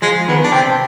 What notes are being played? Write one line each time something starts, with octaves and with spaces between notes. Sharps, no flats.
F3 G#3
D#3 B3
D4
C3 C4